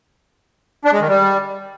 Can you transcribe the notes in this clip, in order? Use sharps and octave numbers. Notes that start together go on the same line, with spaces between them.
D4
G#3
D#3
G3